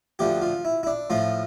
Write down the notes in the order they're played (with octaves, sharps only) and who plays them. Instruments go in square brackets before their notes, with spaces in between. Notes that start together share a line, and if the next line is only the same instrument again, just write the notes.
[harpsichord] D2 D3 F3 A3 G4
F4
E4
E4
D4
A2 F3 A3 F4